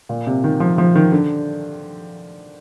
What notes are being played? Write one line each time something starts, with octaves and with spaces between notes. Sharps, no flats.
A#2
C3
D#3
F3
F3
D#3
D3